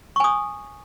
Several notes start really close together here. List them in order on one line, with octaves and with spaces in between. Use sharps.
C#6 G#5 D#6